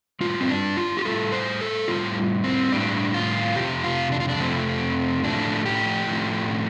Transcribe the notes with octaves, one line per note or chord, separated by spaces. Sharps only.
A2 G3 F4
C4
D4
F4
G4
A2 G3 A4
C5
A4
A2 G3 F4
C4
A2 G3 D4
F4
F2 C3 F3 G4
F4
D4
F4
D4
F2 C3 F3 A3 C4
A2 F3 A3 D4
G4
A2 F3 A3